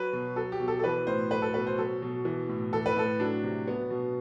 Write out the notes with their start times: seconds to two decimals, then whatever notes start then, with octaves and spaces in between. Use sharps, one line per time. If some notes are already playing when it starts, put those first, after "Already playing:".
Already playing: F#3 B4
0.13 B2
0.36 F#3 A4
0.52 G4
0.60 B2
0.68 A4
0.79 A4
0.84 E3 B4
1.07 A2 C5
1.30 F#3 B4
1.42 A4
1.54 B2 B4
1.67 C5
1.78 F#3 A4
2.02 B2
2.25 E3
2.49 A2
2.73 E3 A4
2.86 B4
2.96 A2 A4
3.19 F#3 D4
3.43 C3
3.67 F#3 B3
3.90 B2